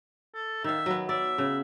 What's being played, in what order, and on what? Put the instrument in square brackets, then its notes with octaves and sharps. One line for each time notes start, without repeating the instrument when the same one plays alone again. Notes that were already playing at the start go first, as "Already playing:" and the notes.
[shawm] A4
[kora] D#3 F5 [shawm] E5
[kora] F#3 B3
[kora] D5 [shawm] E5
[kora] C#3